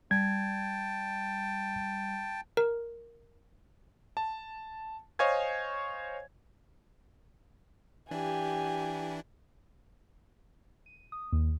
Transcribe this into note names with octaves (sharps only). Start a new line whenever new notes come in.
G3 G5 A5 G#6
A#4
A5
C5 C#5 D#5 F5 G#5 G#6
E3 D4 E4 G4 G#5
D#7
D#6
D#2